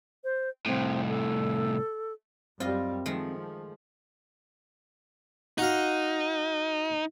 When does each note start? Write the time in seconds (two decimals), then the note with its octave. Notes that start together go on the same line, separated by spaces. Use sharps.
0.24 C5
0.66 C2 A2 C4
1.08 A4
2.60 F#2 G3 C4 F4 D#5
3.06 D#3 F3 G#3 A3
5.58 D#4 F#4 F5